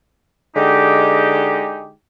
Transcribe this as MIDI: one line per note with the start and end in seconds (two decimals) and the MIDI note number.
0.56 1.92 50
0.56 1.92 56
0.56 1.92 63
0.56 1.92 67